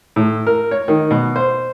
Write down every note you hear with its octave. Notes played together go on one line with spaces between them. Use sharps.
A2
A#4
C#5
D#3
B2
C5